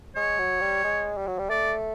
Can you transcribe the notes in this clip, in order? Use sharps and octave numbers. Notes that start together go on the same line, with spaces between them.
G#3 C#5
F#3
G3
G#3
G3
F#3
G3
A3 D5